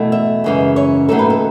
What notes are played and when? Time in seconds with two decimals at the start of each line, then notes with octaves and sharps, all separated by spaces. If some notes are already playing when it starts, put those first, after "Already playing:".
Already playing: E2 B2 A3 E4
0.12 E5
0.44 F#2 C#3 E3 G#3
0.76 C#5
1.08 D#2 C#3 F#3 A3 D#4 A4
1.19 B4
1.30 A4